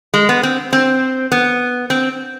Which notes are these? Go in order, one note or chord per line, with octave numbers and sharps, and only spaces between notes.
G#3
B3
C4
C4
B3
C4